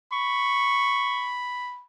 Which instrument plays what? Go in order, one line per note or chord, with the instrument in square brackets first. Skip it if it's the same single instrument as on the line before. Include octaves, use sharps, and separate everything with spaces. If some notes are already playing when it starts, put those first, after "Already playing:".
[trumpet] B5 [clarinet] C#6